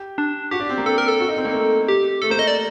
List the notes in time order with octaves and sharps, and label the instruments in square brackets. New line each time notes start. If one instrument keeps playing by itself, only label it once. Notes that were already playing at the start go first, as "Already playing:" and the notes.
Already playing: [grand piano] G4
[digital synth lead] D4
[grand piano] F#4 [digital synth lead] G4
[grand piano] D4
C4
A#3
[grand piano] C4 [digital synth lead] A4
[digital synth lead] A#4
A4
[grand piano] F#4
D#4
C4
A#3
A3
[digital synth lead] G4
[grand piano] A3 [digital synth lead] A4
[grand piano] A#3 [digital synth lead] C5
[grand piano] A3 [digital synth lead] D#5
[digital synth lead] D5